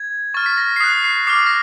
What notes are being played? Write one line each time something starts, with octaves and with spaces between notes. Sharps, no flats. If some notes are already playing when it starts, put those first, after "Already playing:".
Already playing: G#6
C#6 F6 A6
B6
A#6
C7
D#6 F#6 B6
C7
D6 F6 C7
A#6